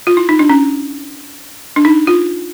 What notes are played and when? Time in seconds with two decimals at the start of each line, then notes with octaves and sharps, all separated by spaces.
0.07 F4
0.17 E4
0.29 D#4
0.39 D4
0.49 C#4
1.76 D4
1.85 D#4
2.07 F4